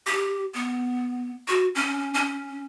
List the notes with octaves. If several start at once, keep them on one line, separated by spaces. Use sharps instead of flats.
G4
B3
F#4
C#4
C#4